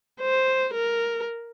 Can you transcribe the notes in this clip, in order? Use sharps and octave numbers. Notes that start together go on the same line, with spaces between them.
C5
A#4